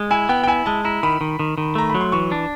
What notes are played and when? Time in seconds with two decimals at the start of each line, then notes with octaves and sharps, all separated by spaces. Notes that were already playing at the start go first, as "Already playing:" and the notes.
Already playing: G#3
0.11 E4 G#5
0.29 B3 G5
0.44 G5
0.47 E4 G#5
0.66 G#3 A5
0.84 E4 A#5
1.03 D#3 B5
1.21 D#3
1.39 D#3
1.58 D#3
1.75 A3 A#5
1.90 F#3 B5
2.01 C6
2.12 E3 C#6
2.32 D4